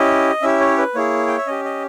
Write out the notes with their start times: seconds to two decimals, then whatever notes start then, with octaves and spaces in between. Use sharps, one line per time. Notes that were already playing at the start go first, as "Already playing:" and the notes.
Already playing: C#4 E4 G4 D#5
0.42 C#4 E4 G4 E5
0.60 C#5
0.78 B4
0.95 A#3 E4 G#4 C#5
1.27 G5
1.38 E5
1.47 C#4 G4 D#5
1.65 D#5